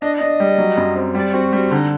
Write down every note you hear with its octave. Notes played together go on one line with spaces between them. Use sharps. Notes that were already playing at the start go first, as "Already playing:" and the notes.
D4 D#5
D4 D#5
G3
F#3
F#2
C4
G3 D5
C4 F#4
G3 F#4
D3 D#4